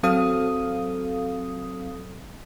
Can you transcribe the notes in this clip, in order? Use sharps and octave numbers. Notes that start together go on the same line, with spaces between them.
F#3 C4 A4 F5 D#6